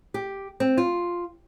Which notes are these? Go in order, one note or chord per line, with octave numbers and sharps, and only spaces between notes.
G4
C4
F4